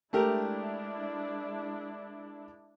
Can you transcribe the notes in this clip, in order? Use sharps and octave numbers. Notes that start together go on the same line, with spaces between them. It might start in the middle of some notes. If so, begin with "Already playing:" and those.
G#3 A3 D4 E4 G4 A#4